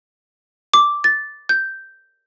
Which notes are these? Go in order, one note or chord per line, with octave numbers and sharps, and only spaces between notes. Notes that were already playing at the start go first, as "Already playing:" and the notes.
D6
A6
G6